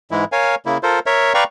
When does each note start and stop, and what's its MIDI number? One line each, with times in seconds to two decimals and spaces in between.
0.11 0.25 44
0.11 0.25 52
0.11 0.25 56
0.11 0.25 64
0.32 0.55 70
0.32 0.55 73
0.32 0.55 77
0.32 0.55 80
0.66 0.78 49
0.66 0.78 58
0.66 0.78 64
0.83 0.99 65
0.83 0.99 69
0.83 0.99 70
0.83 0.99 72
1.06 1.33 70
1.06 1.33 73
1.06 1.33 76
1.34 1.44 71
1.34 1.44 74
1.34 1.44 77
1.34 1.44 79
1.34 1.44 82
1.34 1.44 85